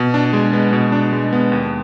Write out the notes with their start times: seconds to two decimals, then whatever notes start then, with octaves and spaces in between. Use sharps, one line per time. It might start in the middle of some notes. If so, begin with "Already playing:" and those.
Already playing: B2
0.14 D4
0.33 G#3
0.53 B3
0.73 B2
0.92 D4
1.13 G#3
1.33 B3
1.52 D#2